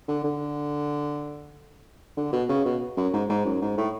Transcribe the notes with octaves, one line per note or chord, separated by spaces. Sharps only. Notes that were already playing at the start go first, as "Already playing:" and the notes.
D3
D3
D3
B2
C#3
B2
F#2
G#2
G#2
F#2
G#2
A2